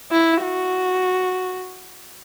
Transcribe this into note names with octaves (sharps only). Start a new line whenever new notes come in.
E4
F#4